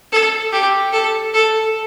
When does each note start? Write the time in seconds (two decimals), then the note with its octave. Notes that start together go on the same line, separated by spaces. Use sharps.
0.12 A4
0.52 G4
0.93 A4
1.34 A4